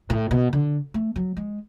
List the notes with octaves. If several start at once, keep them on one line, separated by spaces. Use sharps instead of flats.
A2
B2
D3
A3
F#3
G#3